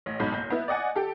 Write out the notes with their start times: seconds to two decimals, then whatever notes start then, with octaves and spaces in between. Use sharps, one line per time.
0.06 A1
0.20 B1 G#2 B5 G6
0.32 F#1 G6
0.50 B3 E4
0.68 D5 D#5 F#5 G#5
0.96 G4 A4